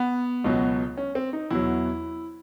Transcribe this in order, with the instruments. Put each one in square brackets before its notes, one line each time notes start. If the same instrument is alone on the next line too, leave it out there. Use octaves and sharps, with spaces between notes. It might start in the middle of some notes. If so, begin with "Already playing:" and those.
Already playing: [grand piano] B3
C#2 B2 F#3
C#4
C4
D#4
E2 B2 F#3 E4